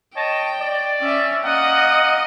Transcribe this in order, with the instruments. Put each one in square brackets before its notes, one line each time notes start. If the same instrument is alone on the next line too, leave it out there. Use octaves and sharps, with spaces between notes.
[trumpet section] C#5 D#5 A5 [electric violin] G5
[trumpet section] D5
[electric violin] C#4 E5
[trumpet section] A#3 F#5 [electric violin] D#5